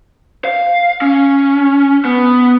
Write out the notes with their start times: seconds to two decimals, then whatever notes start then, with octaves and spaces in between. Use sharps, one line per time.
0.45 F5
1.02 C#4
2.05 B3